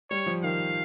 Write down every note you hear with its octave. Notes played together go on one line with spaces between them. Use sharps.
G3 C#5
F3
D#3 F5